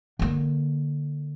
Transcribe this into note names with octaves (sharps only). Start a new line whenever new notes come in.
D3 A#3